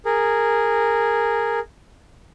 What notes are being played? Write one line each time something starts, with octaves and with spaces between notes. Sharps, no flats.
G#4 A#4